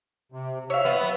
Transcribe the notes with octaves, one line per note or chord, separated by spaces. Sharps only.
C3
C#5 E5 F5 E6
B3
F#3 B4